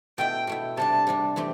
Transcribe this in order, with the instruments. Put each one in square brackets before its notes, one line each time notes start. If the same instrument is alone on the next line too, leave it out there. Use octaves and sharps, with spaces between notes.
[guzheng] B2 A3 E4 [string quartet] G5
[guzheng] B2 A3 E4
[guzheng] C3 G3 D4 [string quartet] A5
[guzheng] C3 G3 D4
E3 A3 C4 G4